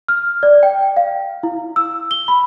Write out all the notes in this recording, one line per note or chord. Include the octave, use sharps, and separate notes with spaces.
F6
D5
G5
F5
E4
E6
G7
B5